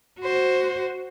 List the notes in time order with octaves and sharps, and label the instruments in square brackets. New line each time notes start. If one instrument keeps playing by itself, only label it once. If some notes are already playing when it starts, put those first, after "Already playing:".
[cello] F#4 C5